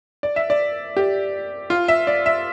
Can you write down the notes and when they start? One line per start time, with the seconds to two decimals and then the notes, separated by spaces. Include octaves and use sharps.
0.23 D5
0.36 E5
0.50 D5
0.97 G4
1.70 F4
1.88 E5
2.07 D5
2.26 E5